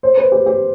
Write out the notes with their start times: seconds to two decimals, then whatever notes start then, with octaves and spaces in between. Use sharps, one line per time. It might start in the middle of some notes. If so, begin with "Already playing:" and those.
0.03 C5
0.18 B4
0.32 G4
0.46 G4